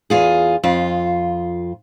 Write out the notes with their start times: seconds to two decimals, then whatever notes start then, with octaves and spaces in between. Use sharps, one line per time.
0.10 E2 F4 G#4
0.63 F2 F4